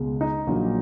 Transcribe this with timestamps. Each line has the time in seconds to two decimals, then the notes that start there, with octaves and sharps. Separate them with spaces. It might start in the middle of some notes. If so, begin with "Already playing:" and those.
Already playing: C#2 B2 G#3
0.21 D#4
0.47 A#1 A#2 F#3 A#3